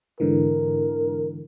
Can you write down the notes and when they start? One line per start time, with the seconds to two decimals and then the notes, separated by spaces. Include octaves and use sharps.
0.20 G#2 D3 E3 A#4